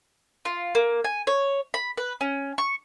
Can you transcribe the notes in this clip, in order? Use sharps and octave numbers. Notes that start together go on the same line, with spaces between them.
F4
A#3
G#5
C#5
B5
B4
C#4
C#6